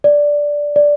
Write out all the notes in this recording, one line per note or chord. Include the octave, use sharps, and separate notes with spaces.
D5
D5